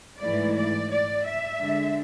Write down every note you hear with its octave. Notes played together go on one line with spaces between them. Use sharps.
G#2 E3 A3 E4 D5
D5
D5
E5
D3 G#3 D4